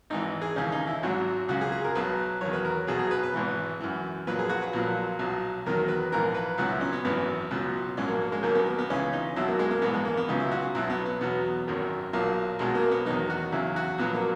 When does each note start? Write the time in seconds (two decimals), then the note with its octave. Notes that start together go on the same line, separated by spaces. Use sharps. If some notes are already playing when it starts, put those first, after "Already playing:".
0.10 G#1 G#2 E3 D#4
0.41 G#4
0.56 D#2 C#3 E3 C#4
0.72 D#4
0.87 E4
1.03 G#1 G#2 F#3 F#4
1.48 C#2 C#3 F#3 F#4
1.61 G#4
1.72 G#4
1.84 A#4
1.95 B1 B2 F#3 B4
2.41 E2 D#3 F#3 C#5
2.53 B4
2.65 A#4
2.87 B1 B2 F#3 G#4
2.99 G#4
3.11 B4
3.23 B4
3.34 G#1 G#2 E3
3.81 F#2 E3
4.27 A#1 A#2 F#3 B4
4.39 G#4
4.49 F#4
4.62 B4
4.73 A#1 A#2 F#3
5.19 B1 B2 F#3
5.66 E2 D#3 F#3 A#4
5.88 B4
6.12 A#1 G#2 E3 A#4
6.34 B4
6.58 C#2 B2 F#3 F#4
6.70 E4
6.81 C#4
6.93 B3
7.05 G#1 F#2 E3 B3
7.51 C#2 B2 F#3
7.97 A#1 G#2 F#3 C#4
8.08 A#3
8.20 A#3
8.32 G#3
8.43 D#2 D#3 F#3 A#3
8.55 B3
8.66 A#3
8.79 B3
8.89 C#2 C#3 E3 C#4
9.13 D#4
9.36 B1 B2 F#3 E4
9.48 A#3
9.59 G#3
9.71 A#3
9.82 A#1 G#2 E3 B3
9.93 G#3
10.05 A#3
10.17 B3
10.28 C#2 C#3 F#3 D#4
10.40 E4
10.51 F#4
10.75 B1 B2 F#3 E4
10.90 B3
11.06 B3
11.21 E2 B2 F#3 B3
11.68 G#1 F#2 D#3 F#3
12.13 B1 A#2 F#3 A#3
12.59 B1 B2 F#3 G#3
12.75 A#3
12.91 B3
13.06 E2 D#3 F#3 D#4
13.30 F#4
13.52 E2 C#3 F#3 E4
13.76 F#4
13.98 A#1 A#2 F#3 B3
14.15 A#3